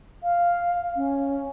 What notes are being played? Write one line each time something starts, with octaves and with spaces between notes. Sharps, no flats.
F5
C#4